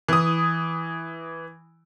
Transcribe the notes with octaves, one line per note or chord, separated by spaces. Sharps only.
E3 D#6